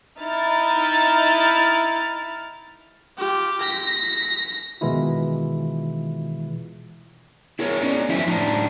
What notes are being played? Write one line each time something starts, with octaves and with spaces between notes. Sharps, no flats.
D#4 E4 F6 A6
F4 G4
A#6 B6
B2 D#3 E3 G#3 E4 F4
E4 G#4 A#4 C#5
C#4 D#4 D5
F3 F#3 E4 C5 E5
A2 D4 D#4 F4